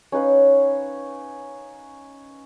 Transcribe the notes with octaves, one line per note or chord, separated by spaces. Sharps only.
C#4 D#4 B4 F5